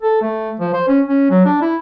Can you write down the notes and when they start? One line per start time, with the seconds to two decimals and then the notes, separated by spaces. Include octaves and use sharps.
0.02 A4
0.22 A3
0.60 F3
0.74 C5
0.88 C#4
1.08 C#4
1.31 F#3
1.45 D4
1.62 E4